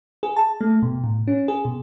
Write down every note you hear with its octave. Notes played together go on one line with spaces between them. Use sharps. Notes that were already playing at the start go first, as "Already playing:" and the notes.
G#4
A5
A3
B2
A2
C#4
G#4
B2